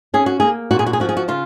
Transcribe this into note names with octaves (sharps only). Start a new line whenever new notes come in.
C#4 G#4
F#4
A#3 G#4
A#2 F#4
G#4
F#4
G#4
F3 F#4
G#4
F#4
C#3 F4